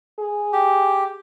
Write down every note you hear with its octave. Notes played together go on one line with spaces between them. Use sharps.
G#4
G4